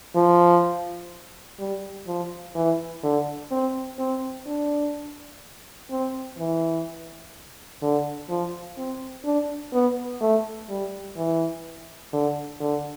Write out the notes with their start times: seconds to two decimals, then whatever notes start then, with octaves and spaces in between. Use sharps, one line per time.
0.15 F3
1.59 G3
2.07 F3
2.55 E3
3.03 D3
3.51 C4
3.99 C4
4.46 D4
5.91 C4
6.38 E3
7.82 D3
8.29 F3
8.77 C4
9.25 D4
9.73 B3
10.21 A3
10.69 G3
11.16 E3
12.13 D3
12.60 D3